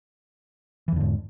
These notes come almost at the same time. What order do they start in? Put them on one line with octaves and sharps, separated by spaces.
E3 E2 D3 G#2